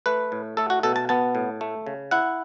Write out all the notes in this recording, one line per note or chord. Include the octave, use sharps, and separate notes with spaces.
A3 B4
A2
A3 A4
F#4
B2 A4
A5
B3 A5
A2
A3
C#3
E4 F#5